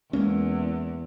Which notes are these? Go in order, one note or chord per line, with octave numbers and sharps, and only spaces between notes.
E2 G#3 A#3 C#4